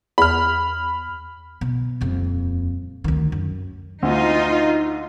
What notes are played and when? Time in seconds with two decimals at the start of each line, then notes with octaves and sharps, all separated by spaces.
0.18 E2 B5 F6
1.61 B2
2.01 D#1 F2
3.04 D2 D#3
3.32 F#2
4.03 D2 D#4 F4